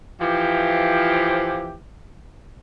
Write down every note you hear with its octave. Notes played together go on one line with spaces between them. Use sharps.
E3 F3 G4